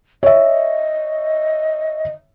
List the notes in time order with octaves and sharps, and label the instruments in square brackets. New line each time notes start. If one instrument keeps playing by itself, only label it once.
[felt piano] C#5 E5 [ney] D#5